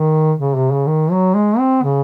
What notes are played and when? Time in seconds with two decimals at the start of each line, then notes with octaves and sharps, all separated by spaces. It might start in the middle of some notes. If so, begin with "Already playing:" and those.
Already playing: D#3
0.39 C#3
0.56 C3
0.72 C#3
0.87 D#3
1.11 F#3
1.34 G#3
1.58 C4
1.83 C#3